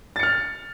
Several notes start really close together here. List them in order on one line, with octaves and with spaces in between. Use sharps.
A6 C#7 F6